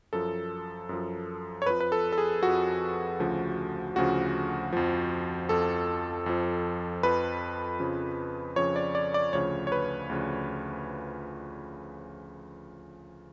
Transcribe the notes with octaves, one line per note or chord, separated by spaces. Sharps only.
F#2 F3 A4
F#2 F3
C#5
F2 F3 B4
B4
A4
A4
G#4
F2 F3 F#4
D2 C#3 F3
D2 C#3 F3 F#4
F2 F3
F2 F3 A4
F2 F3
F2 F3 B4
F2 C#3 F3
F2 C#3 F3 C#5
D5
D5
D5
D2 C#3 F3 C#5
C#5
B4
D2 C#3 F3